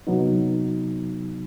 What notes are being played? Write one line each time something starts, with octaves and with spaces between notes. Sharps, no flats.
C3 F#3 B3 D#4